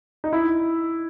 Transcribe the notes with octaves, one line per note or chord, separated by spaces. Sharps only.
D#4
E4